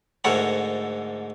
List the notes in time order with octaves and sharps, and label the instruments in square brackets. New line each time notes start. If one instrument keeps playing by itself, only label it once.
[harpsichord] D2 G#2 A4 A#4 C#5 F#5